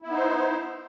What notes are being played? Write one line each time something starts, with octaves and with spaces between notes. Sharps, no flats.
B3 D#4 E4 C5